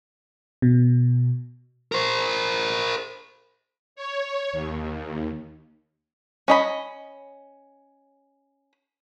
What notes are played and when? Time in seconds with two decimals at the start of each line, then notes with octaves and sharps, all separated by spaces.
0.62 B2
1.92 A#4 C5
3.96 C#5
4.52 D#2
6.48 C#4 D#5 B5